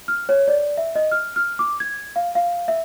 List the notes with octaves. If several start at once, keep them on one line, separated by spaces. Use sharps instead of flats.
F6
C#5
D5
E5
D#5
F6
F6
D6
G#6
F5
F5
E5